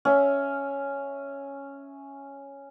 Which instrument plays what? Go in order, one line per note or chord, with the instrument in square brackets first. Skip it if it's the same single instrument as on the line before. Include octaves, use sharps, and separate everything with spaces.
[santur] C#4 E5